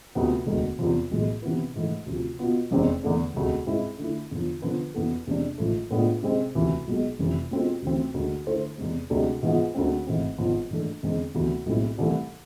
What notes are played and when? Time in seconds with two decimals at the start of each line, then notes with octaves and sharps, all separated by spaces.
0.15 D2 C3 F3 B3
0.46 E1 D2 D3 G#3
0.79 E2 C3 F3
1.11 B1 A2 E3 G#3
1.42 C3 E3 B3 E4 B4
1.75 G#2 E3 A3
2.06 D2 C3 F3
2.39 B2 B3 F4
2.71 F1 E2 C3 G#3 C4
3.03 E2 D3 A3 D4
3.34 E1 D2 C3 G#3
3.67 G#2 G#3 C4 E4
3.98 D3 A3 E4
4.31 E2 D3 F3
4.62 D3 F3 B3 F4 B4
4.95 E2 B2 B3 E4 A4
5.27 E2 C3 G#3 D4
5.58 A1 G#2 F3 A3
5.91 A2 G#3 B3 D4 F4
6.23 C3 G#3 C4
6.55 E1 D2 C3 E3
6.87 B1 B2 G#3
7.19 F1 F2 C3 E3
7.51 B2 G#3 C4 F4 A4
7.82 D2 C3 E3 A3 C4
8.14 D2 D3 G#3
8.46 D3 A3 E4 A4 C5
8.78 E2 C3 G#3
9.10 D2 C3 G#3 D4 A4
9.42 G#2 E3 B3 F4 G#4
9.75 D2 D3 G#3 C4
10.07 G#1 G#2 E3 A3 C4
10.38 G#1 G#2 F3 B3
10.71 G#2 E3 A3 D4 A4
11.03 E2 D3 G#3 C4
11.34 D2 C3 E3 B3
11.66 B1 A2 G#3 C4 E4
11.98 C2 C3 E3 A3